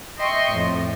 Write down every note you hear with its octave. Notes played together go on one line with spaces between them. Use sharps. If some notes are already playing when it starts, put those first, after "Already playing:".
D#5 E5 G5 C6 C#6
F2 A2